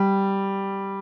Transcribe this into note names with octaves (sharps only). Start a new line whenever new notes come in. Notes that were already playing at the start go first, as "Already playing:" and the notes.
Already playing: G3